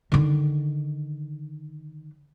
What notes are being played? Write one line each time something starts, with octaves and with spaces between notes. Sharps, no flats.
D3 D#3